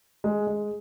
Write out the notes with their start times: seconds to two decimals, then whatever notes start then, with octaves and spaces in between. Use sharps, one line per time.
0.24 G#3
0.47 G#3